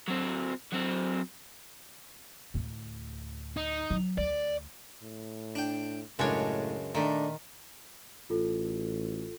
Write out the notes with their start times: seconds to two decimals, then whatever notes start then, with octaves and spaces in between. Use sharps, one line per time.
0.08 F#3 C4
0.73 F#3 C4
2.54 D2 A2
3.57 D#4
3.90 F#3
4.18 D2 D5
5.03 A2
5.55 D4 G5
6.19 C#2 F#2 A2 C#3 G#3 D4 C#5
6.95 A#2 D#3 A3 D4
8.30 A1 F4 A4